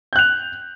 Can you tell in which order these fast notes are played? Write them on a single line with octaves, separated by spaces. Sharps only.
G6 F#6 F7